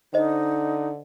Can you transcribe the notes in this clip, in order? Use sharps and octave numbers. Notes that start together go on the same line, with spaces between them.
D3 D#4 C5 D#5